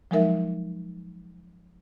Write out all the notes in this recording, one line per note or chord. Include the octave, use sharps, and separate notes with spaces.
F3 F#3 G#3 D#4 A#4 E5